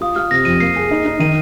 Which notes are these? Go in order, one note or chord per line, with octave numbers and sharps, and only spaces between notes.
F4 D#6
F4 F6
C3 A#6
F2 D#7
A#3 C7
G#4
D#4
D#4
D#3 D#7